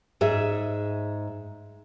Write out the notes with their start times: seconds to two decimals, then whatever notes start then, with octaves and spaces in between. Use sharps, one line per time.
0.21 G#2 G#4 E5